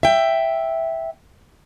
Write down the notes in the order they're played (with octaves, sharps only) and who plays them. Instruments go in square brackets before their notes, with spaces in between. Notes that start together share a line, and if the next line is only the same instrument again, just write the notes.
[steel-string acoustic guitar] E5 G5